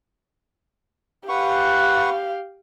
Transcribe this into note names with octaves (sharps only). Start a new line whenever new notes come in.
G4 B4 F5 F#5 C#6